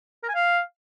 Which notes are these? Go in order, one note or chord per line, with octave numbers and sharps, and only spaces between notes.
A#4
G#5
F5